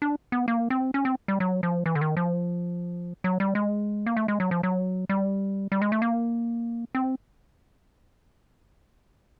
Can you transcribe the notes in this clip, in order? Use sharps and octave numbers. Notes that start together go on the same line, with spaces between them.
D4
B3
A#3
C4
C#4
C4
G3
F#3
F3
E3
D3
D#3
F3
F#3
G3
G#3
A#3
A3
G#3
F#3
F3
F#3
G3
G3
G#3
A3
A#3
C4